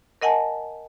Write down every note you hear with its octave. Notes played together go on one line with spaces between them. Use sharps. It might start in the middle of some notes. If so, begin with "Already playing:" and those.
A#4 D#5 F#5 G#5 A5